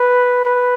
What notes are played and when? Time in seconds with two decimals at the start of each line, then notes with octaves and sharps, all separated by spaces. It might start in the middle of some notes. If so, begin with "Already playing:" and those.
Already playing: B4
0.45 B4